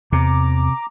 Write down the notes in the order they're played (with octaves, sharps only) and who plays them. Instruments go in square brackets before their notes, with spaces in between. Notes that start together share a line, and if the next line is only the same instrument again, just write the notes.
[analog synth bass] E2 [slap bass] C3 [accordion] A#5 D6